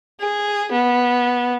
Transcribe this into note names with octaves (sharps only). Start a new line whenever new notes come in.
G#4
B3